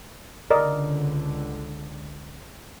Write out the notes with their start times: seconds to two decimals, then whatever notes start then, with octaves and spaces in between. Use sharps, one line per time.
0.51 C#2 D3 A#4 D5 D#5